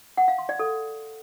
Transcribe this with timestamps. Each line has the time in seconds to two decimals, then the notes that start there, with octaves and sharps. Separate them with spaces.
0.17 F#5
0.28 F5
0.38 C6
0.49 D5
0.59 A4